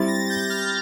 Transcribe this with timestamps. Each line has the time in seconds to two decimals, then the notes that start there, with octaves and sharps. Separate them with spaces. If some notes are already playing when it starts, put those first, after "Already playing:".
Already playing: G3 C4 E4 G4 A6
0.08 A#6
0.30 G6
0.44 G6
0.50 F6